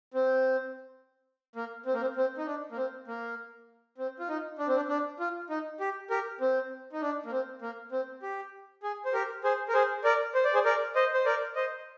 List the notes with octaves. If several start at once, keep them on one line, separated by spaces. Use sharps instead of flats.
C4
A#3
C4
A#3
C4
C4
D#4
D4
A#3
C4
A#3
C4
F4
D#4
D4
C4
D4
D4
F4
D#4
G4
G4 A#4
C4
D#4
D4
A#3
C4
A#3
C4
G4
G#4
C5
G4 A#4
G#4 C5
A#4
G#4 C5
A#4 D5
C5
D5
G#4 C5
A#4 D5
C5 D#5
C5
A#4 D5
C5 D#5